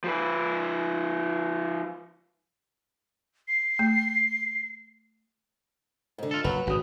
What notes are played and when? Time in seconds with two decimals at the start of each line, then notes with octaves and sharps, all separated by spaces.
0.04 F3 B4
3.48 C7
3.79 A3
6.18 G#2 D3
6.31 F4 A4
6.44 F#1 F#3 B4
6.67 G#1 F#2 A2 C#3 F#4 D#6